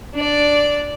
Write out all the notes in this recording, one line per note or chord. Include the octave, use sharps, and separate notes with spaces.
D4 D5